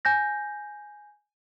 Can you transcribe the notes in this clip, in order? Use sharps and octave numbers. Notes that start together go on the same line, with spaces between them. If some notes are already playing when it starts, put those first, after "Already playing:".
G#5 G6 A#6